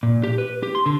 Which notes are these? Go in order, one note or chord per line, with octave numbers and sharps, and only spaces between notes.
A#2
G4
B4
G4
C6
D3